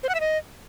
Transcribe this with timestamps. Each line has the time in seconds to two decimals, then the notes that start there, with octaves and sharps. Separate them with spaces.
0.03 C5
0.09 F#5
0.15 E5
0.20 D#5